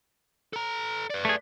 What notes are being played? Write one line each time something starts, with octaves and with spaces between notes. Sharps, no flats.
A4 A#5
B4 D5
A3 G#4